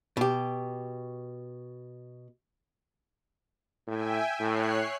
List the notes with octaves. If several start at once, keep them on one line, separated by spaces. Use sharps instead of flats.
B2 G4
A2 E5 G5 G#5
A2 C#5 F#6 C7